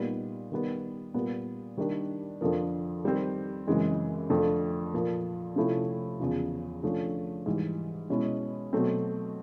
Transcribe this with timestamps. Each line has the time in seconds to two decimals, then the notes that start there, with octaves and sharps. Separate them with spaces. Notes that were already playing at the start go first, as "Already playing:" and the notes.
Already playing: A#2 G3 B3 D#4
0.52 D#3 G3 B3
1.14 A#2 G3 B3
1.77 D#3 G3 A#3 D4
2.41 F2 D3 F3 A#3
3.05 D#3 G3 C4
3.67 F#2 C#3 E3 G#3 C4
4.30 F2 D3 F3 A3
4.94 A#2 F3 A#3
5.56 C3 F3 A3 C#4 E4
6.20 E2 C#3 F3
6.83 D3 F3 A3 C#4
7.46 G#2 E3 G3
8.10 B2 G#3 C#4 E4
8.73 B2 F#3 A3 C4